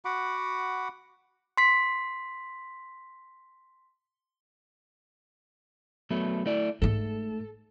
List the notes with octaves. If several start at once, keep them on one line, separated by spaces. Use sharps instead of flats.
F#4 F#5 B5 D6
C6 B6
F#3 A3 B3
A3 E4 D5
G#2 A3 A4